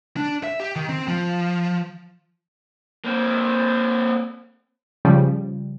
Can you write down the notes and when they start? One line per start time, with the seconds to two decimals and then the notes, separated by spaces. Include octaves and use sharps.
0.17 D4
0.44 E5
0.60 G4
0.76 D#3
0.89 C4
1.08 F3
3.05 A#3 C4
5.05 C#3 F3 G3